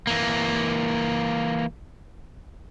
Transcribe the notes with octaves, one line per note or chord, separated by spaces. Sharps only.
E3 A#3